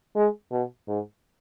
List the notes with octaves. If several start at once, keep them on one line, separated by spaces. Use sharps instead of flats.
G#3
B2
G#2